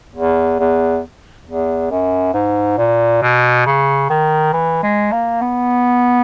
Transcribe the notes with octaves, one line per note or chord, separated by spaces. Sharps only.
E2
E2
E2
F#2
G#2
A#2
B2
C#3
D#3
E3
G#3
A#3
B3